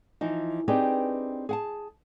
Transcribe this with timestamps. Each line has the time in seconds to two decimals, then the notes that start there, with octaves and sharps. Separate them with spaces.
0.21 E3 F3 D#4
0.68 C4 D4 D#4 G4 G#4 B4
1.49 G#4 F#5 A5